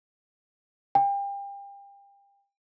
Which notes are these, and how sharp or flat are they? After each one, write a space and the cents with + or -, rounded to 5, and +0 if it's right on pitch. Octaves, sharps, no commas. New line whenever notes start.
G5 +30